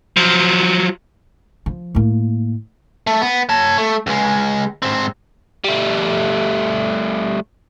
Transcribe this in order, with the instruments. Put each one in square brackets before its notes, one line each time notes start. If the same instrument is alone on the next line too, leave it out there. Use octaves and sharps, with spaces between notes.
[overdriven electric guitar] F3 F#3
[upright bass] F3
A2 A#3
[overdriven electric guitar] A3
B3
C#5 A5
A3
C#2 G#3
G#2 C4
G3 A3